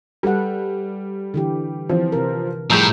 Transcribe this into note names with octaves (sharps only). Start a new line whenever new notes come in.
G3 A4 B4 F#5
D3 E3 G4
E3 F3 C4
C3 A#4
A2 F3 G3 G#4 A#5 G6 E7